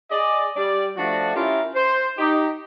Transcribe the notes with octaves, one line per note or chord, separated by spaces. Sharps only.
G#4 D5 D#5
G3 D5
F3 A3 D4 F#4
C#4 E4 F4 G4 A#4
C5
D#4 G4